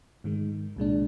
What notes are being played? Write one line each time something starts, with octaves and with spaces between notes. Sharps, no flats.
G#2 D#3 G#3
C2 A#2 G#3 D4